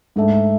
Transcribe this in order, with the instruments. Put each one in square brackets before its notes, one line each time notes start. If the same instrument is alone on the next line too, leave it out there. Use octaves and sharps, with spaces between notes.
[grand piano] G#2 [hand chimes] A3 D4 A4 E5 A5